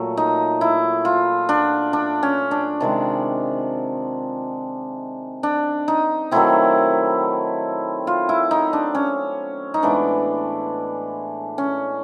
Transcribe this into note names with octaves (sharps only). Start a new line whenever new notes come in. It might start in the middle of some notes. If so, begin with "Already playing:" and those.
Already playing: A#2 F#3 A3
D#4
E4
F4
D4
D4
C#4
D4
C3 D#3 G#3 D4
D4
D#4
D#3 F#3 A3 C4 E4
F4
E4
D#4
D4
C#4
D#4
A2 E3 G#3 B3 D4
C#4